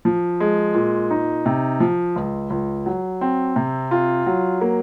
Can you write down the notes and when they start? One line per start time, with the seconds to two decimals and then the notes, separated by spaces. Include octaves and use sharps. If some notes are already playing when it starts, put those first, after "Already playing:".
0.05 F3
0.40 G#3
0.75 A#2
1.11 D#4
1.46 C3
1.80 F3
2.16 C#2
2.50 C#2
2.86 F#3
3.21 C4
3.56 C3
3.91 F4
4.26 F#3
4.61 A#3